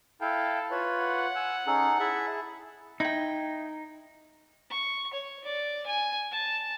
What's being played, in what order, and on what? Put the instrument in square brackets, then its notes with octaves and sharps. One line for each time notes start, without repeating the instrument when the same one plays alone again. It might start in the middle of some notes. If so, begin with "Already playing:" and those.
[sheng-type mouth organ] E4 F5 G5 [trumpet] A4
[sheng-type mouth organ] F4 B4 C#5
[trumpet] F#5
[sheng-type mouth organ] G#5 E6
[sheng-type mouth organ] C#4 [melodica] D#4 G#4 A4
[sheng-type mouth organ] E4 G#4 A5 [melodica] E5
[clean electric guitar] D#4 [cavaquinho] E4 G5
[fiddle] C#6
C#5
D5
G#5
A5